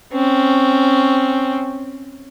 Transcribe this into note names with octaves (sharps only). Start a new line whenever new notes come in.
C4 C#4